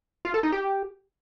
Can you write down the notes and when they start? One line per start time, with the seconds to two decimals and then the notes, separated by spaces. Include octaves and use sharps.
0.25 F4
0.34 A4
0.43 D#4
0.52 G4